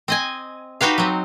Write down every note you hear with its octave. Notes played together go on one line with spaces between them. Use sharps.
C4 D#5 G#5
D#4 F#4 G4 B4 F5
F#3 C4